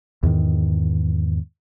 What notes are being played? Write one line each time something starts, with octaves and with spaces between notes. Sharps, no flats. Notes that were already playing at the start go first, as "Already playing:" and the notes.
E2 G#2 D#3